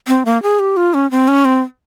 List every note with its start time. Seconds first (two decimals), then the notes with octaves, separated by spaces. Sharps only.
0.08 C4
0.25 A#3
0.43 G#4
0.59 G4
0.77 F4
0.94 C#4
1.11 C4
1.28 C#4
1.45 C4